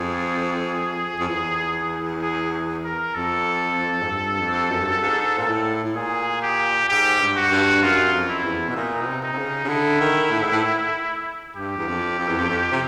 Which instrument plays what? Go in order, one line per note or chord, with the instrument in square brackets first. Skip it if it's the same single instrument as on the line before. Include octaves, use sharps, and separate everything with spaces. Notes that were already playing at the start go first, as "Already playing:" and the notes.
Already playing: [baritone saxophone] F2 [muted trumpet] G#4
[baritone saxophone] F2
E2
[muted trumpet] G#4
A#4
[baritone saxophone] F2 [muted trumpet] A4
[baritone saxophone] G#2
G2
F2
F#2
G2
F#2
G#2
A#2
A2
A2
[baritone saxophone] A#2 [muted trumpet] G#4
[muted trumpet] G4
[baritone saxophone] G#2 [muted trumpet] G4
[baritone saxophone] G2
[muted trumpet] F#4
[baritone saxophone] G2
[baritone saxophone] F#2 [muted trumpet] F4
[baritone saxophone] F2
[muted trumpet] E4
[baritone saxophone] E2
B2
[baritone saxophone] A#2 [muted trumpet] D#4
[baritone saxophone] B2
C3
[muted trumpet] D#4
[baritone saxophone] C3
C#3
C#3
[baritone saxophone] D3 [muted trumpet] E4
[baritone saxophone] D#3
A2
G#2
A2
[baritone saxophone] G2 [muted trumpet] G4
[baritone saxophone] E2
F2
F2
E2
F2
F2
C3